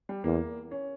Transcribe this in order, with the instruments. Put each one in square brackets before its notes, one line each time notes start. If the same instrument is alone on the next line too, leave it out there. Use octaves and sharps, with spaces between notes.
[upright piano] G3
[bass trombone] E2 [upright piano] A#3
[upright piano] C#4